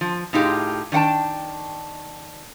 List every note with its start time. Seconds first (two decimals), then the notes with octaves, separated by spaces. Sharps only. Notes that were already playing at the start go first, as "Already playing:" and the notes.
0.01 F3
0.33 A2 D#4 F4 G4 G#4
0.92 D#3 D4 F#5 G5 A5